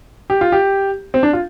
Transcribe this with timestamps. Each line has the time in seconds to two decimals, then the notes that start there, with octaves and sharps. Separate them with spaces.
0.30 G4
0.41 F4
0.52 G4
1.14 C4
1.23 D4
1.33 F4